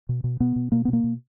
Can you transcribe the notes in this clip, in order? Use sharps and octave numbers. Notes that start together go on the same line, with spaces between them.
B2
B2
B2 B3
B2
B2 A#3
B3
B2 A#3
B2